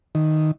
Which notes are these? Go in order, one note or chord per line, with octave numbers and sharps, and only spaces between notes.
D#3